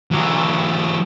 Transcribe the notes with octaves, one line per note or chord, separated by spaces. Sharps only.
E3 F#3